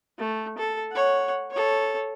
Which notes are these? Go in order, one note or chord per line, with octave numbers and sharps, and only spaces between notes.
A3
A4
C#5 F#5
A4 C#5